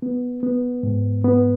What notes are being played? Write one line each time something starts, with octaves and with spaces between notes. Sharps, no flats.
B3
B3
G#2
B3